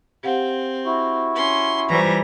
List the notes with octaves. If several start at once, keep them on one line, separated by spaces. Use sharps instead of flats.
C4 G4 F5 F#5
E4 F#4
C#4 C6
E3 G3 F4 C5 A#5